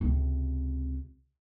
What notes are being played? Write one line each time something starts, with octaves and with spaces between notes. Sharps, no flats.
C#2 C3